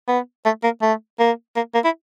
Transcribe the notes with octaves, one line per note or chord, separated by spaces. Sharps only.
B3
A3
A#3
A3
A#3
A#3
A#3
E4